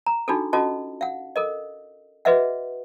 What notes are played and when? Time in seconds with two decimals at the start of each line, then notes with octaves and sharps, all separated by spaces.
0.07 A#5
0.28 D4 D#4 F4 F#4 G#4 A4
0.53 C#4 F4 F#4 A4 D#5 A5
1.01 F5 F#5
1.36 A4 A#4 D#5
2.25 F#4 G#4 B4 D#5 E5 F#5